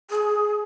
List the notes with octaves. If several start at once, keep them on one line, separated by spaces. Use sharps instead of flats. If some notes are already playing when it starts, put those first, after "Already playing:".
G#4